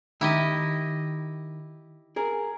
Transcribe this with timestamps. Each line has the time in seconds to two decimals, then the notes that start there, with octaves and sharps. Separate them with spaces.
0.21 D#3 E4 G4 D#5
2.16 G#4 A#4